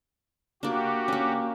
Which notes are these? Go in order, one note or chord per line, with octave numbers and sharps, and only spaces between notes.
A#3 D4 F#4 G4
A#3 C#4